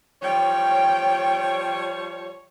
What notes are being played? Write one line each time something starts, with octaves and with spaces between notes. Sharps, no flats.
F3 G3 C#5 G5